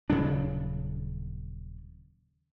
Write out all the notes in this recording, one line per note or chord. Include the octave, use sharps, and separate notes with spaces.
D#1 C#3 F#3 D4